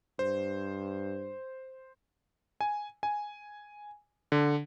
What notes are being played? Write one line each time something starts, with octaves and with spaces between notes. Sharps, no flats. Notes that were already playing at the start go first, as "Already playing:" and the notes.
G2 C5
G#5
G#5
D3